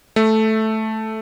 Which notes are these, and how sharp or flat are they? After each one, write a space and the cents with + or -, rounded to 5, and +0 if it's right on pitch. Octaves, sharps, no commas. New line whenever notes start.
A3 -5